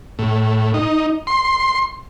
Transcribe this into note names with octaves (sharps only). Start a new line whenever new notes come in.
A2
D#4
C6